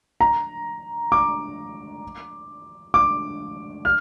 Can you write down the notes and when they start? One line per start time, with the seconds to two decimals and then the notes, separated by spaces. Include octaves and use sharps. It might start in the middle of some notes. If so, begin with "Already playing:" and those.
0.21 A#5
1.12 D6
2.94 D6
3.85 F6